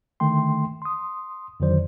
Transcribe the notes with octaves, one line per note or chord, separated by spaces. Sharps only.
D3 D#3 A3 G5 C6
C6 D#6
F2 D3 D#3 F#3 C5 D5